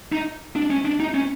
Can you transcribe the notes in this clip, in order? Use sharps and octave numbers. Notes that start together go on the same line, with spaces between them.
D#4
D4
C#4
D4
D#4
C#4